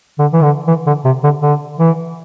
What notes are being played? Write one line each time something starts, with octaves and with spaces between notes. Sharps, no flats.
D3
E3
D3
E3
D3
C3
D3
D3
E3